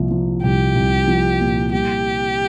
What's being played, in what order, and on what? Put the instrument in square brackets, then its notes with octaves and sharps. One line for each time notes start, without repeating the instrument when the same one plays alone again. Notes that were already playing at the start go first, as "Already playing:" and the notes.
Already playing: [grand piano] C2 A#2 F3
F3
[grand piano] C2 [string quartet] G4
[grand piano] C2
F3
A#2
[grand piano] G3 [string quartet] G4